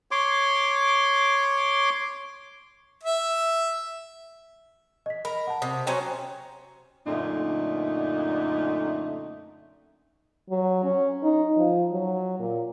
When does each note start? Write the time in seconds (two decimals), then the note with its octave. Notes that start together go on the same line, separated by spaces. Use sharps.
0.11 C#5 C6 D6
3.03 E5
5.06 D#5 B6
5.25 A#4 B5
5.47 F#5 A5
5.62 C3 D#6
5.87 F#3 C#4 C5 G5 G#5 A#5
7.06 F#2 A#2 D3 A3 D#4
10.50 F#3
10.84 C#4
11.23 D#4
11.57 F3
11.92 F#3
12.39 A#2